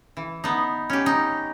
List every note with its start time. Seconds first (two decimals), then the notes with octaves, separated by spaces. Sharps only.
0.17 E3
0.44 B3 D#4
0.90 C#4 G4
1.06 D#4